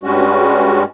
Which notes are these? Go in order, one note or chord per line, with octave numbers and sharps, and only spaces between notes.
G2 G3 G#3 C#4 F#4